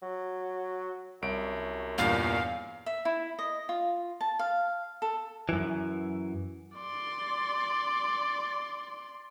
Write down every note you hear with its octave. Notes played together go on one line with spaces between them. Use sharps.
F#3
C2 F#2 D7
E2 G2 A#2 F5
E5
E4
D#5
F4
A5
F5
A4
F#2 E3
D5 C6